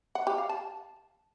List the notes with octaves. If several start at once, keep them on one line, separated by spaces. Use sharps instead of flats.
F#5
G4
F5
A5